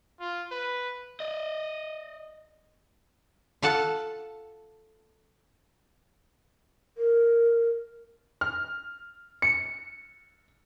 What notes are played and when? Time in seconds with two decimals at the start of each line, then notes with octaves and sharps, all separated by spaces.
0.20 F4
0.51 B4
1.20 D5 D#5
3.62 F4 A4 F#5 A5
6.98 A#4
8.41 F6
9.42 C#7